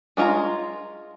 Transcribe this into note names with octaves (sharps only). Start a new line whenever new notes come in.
G#3 D4 F4 C#5 A#5